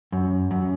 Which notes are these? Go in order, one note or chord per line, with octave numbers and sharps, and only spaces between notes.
F#2
F#2